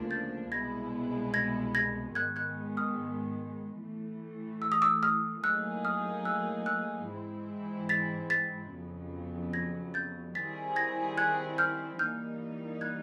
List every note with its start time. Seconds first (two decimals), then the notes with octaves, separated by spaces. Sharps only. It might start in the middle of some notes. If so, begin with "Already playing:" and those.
Already playing: D2 C#3 F3 A#3 D4
0.11 G6 A6
0.52 C2 B2 G#3 B3 E4 G#6 A#6
1.34 G#6 A#6
1.75 G#6 A#6
2.15 G#2 D#3 G#3 B3 F#6 G#6
2.36 F#6 G#6
2.77 D#6 F6
3.80 A2 E3 A3
4.62 E6
4.72 D#6
4.82 D6 E6
5.03 D#6 F6
5.44 A2 F#3 A#3 D#4 G#4 E6 F#6
5.85 D#6 F6
6.25 E6 F#6
6.66 E6 F#6
7.08 G#2 E3 G#3 C4 E4
7.89 A6 B6
8.30 A6 B6
8.72 F2 C#3 F#3 B3
9.53 G#6 A#6
9.94 G6 A6
10.35 D#3 G3 C4 E4 G#4 A6 B6
10.76 G#6 A#6
11.17 F#6 G#6
11.58 F6 G6
11.99 E3 G3 A#3 D#4 F6 G6
12.81 F#6 G#6